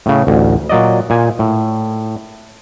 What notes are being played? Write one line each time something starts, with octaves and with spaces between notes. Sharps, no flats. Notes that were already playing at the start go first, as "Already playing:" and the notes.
A2 C#3
A1 D2
A#2 F#3 D5 D#5
A#2 G#5
A2